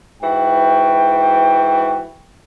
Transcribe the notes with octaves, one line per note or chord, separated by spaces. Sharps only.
G#2 E3 F#4 G5